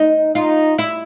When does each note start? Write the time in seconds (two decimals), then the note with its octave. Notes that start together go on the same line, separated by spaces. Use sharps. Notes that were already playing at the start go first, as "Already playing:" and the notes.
Already playing: D#4
0.35 D#4 F4
0.78 E4